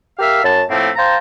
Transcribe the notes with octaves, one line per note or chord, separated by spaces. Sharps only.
G4 A#4 E5 F5
F#2 A5
A2 F3 A3 A#3 C4
C5 F5 G5 A5 A#5